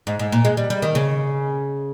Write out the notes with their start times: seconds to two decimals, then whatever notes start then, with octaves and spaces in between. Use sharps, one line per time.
0.07 G#2
0.19 G#2
0.32 A#2
0.45 G#3
0.57 G3
0.70 G3
0.82 D#3
0.95 C#3